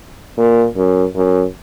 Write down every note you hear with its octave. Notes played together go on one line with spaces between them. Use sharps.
A#2
F#2
F#2